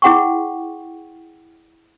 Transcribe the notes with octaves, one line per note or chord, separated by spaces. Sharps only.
E4 G#4 F#5 G5 C6 C#6